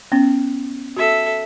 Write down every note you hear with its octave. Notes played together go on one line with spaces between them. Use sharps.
B3 C#4
F#4 A4 E5